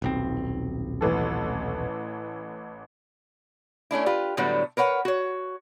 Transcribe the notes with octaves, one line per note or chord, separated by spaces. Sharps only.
D#1 B1 C4
A1 E3 A4
A3 C#4 D4 E4
F4 G4 B4
A2 D3 F#3 G3 A3 B3
A#4 B4 C#5 F#5
F#4 C#5